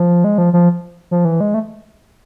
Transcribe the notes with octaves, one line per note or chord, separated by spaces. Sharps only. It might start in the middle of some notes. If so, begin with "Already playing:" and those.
Already playing: F3
G#3
F3
F3
F3
E3
G#3
A3